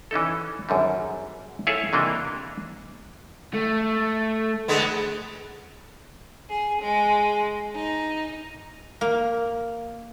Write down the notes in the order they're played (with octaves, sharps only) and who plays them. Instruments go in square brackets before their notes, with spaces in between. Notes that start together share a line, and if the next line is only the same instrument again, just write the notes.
[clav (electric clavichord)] E3 C#4 D#4 A4
G#1 F#2 D3 G3
E4 F4 G#4 A4 C#5 E5
C3 E3 A#3 D4 D#5
[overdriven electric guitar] A3
[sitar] D3 G#3 B3
[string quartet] G#4
G#3
D#4
[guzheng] A#3